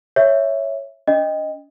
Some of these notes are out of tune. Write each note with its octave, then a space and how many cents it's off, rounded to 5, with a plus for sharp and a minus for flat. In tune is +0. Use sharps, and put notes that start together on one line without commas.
C#5 +0 E5 +0
D4 -45 D#5 +0